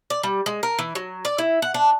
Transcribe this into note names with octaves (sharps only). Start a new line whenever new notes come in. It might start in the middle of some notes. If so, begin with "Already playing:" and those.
D5
G3
G#3
A#4
E3
F#3
D5
E4
F#5
D4